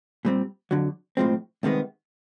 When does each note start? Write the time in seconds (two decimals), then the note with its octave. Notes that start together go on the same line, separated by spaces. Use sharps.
0.25 A#2 G3 C4
0.71 F2 D3 F#3
1.17 B1 A2 F3 G#3 C4
1.63 C2 C3 D#3 G#3 B3